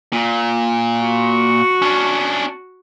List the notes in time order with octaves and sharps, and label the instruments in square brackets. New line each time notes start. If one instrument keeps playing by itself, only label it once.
[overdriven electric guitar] A#2
[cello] F#4
[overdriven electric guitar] C#4 D4